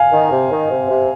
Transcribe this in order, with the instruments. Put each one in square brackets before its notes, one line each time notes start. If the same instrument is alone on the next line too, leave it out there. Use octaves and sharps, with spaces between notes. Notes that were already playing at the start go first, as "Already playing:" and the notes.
Already playing: [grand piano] F5 G#5
[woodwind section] D#3
C3
D#3
C3
C3